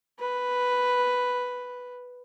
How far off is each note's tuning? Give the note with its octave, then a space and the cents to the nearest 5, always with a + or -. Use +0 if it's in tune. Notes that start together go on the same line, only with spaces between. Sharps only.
B4 +0